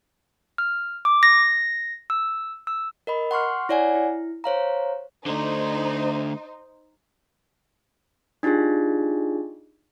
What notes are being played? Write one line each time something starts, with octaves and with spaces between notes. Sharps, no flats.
F6
D6
A#6
E6
E6
A#4 D#5 B5
F#5 C6 C#6 F6
E4 C#5 D5 F#5 G#5
E4
C5 C#5 F5 A#5
D3 A3 D#4 C5
D4 D#4 F4 G4 G#4